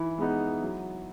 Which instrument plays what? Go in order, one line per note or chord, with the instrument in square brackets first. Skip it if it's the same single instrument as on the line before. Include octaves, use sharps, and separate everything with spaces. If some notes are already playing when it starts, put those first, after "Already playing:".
Already playing: [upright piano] E3 [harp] E4
[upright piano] G#3 B3 D#4
F#3